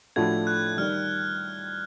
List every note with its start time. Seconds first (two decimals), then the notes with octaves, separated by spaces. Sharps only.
0.16 A2 F3 A3 D4 F#4 G#6
0.47 F#6
0.77 D#3 G3 F6